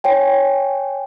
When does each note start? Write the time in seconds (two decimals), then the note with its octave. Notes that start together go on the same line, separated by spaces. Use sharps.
0.04 C#5 G5 G#5